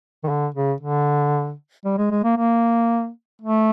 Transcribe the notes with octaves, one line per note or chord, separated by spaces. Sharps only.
D#3
D3
C#3
D3
G3
G#3
G#3
A#3
A#3
A3